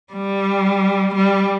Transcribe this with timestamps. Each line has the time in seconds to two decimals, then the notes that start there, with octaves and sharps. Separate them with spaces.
0.13 G3
1.15 G3